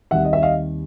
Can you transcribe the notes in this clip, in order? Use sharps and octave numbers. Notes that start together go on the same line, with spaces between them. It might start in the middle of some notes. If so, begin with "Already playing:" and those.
D#2 D#3 G3 C4 E5 F#5
D#5
E5
D#5 F5